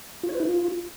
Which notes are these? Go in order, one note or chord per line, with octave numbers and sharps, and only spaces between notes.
F4
C#5
B4
E4
F4